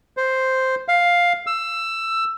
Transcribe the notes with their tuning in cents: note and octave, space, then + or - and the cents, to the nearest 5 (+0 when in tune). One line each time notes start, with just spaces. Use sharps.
C5 +0
F5 +5
E6 +15